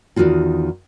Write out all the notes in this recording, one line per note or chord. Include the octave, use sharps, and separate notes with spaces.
E2 B2 D#3 F4 F#4